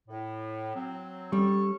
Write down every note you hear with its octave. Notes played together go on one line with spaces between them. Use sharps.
A2
F#3 C4
G3 C#4 A4 C#6